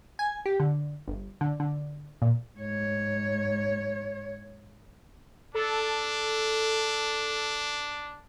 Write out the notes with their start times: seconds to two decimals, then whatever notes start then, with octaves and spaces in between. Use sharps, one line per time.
0.19 G#5
0.46 G4
0.60 D3
1.08 G1
1.41 D3
1.60 D3
2.22 A#2
2.58 G#2 C#5
5.55 D4 A4